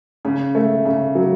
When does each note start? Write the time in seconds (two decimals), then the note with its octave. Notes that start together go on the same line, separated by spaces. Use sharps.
0.25 C#3
0.55 A3
0.85 C#3
1.15 F#3